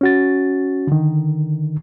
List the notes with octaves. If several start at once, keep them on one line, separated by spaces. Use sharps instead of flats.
C#4 F#4 A6
D3 D#3